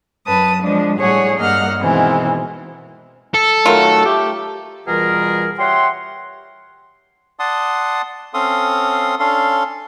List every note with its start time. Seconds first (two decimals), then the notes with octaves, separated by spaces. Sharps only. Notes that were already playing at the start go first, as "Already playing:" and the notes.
0.27 F#2 B4 A5 D#6
0.62 F3 G#3 D4
0.99 A2 G3 G#4 C#5 F#5 G#5
1.38 G2 A#3 D#5 F#5 F6
1.81 B2 D#3 E3 G#3 C4
3.34 A4
3.66 D#3 F#3 A3 F4 A#4
4.05 A3 G4
4.87 B2 E3 G3 F4 G#4 A#4
5.59 G4 C#5 E5 F#5 C6
7.39 D5 F#5 A5 C6 D#6
8.34 C4 C#4 A4 F5 C6 D#6
9.19 C#4 D4 A4 F5 C6